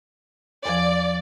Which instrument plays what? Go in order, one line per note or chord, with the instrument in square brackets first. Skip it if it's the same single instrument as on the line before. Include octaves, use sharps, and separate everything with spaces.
[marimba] E2 F3 [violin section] D5